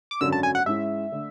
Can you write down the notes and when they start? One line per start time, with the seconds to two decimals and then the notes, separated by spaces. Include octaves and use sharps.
0.11 D6
0.21 G#1 F#2 D3 F#3 C#4 E6
0.32 A5
0.43 G#5
0.55 F#5
0.66 G#2 G#3 C#4 E4 E5
1.12 D3 A3